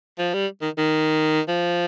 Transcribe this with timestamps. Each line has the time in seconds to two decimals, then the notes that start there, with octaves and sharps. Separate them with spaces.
0.19 F3
0.34 G3
0.61 D#3
0.78 D#3
1.48 F3